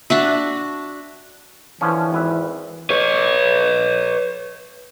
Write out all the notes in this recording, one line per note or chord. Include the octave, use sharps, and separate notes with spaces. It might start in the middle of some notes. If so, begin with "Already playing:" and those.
D4 F#4 E5
D3 E3 F3 C#4
G#1 B4 E5
B4 C#5